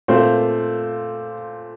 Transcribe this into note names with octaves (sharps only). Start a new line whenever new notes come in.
A#2 A3 C4 F4 C5